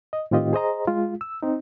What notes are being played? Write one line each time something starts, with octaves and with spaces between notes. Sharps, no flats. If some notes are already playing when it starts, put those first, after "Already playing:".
D#5
A2 D#3 C4 F4 G4 D#5
G#4 C5 D#5 A#5
G#3 F4
E6
C4 D#4